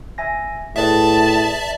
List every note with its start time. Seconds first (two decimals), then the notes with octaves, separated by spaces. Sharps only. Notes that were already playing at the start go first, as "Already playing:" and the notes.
0.18 E5 G#5 A#6
0.76 A2 G#4 B4 D5 E5 A5